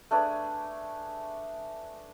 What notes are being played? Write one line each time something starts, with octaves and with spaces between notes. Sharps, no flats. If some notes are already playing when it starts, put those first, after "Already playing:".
A3 D4 G#4 B4